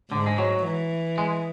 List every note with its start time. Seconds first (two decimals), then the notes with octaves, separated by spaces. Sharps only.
0.12 G#2 D3
0.26 G#3
0.38 F#3
0.65 E3
1.18 G#3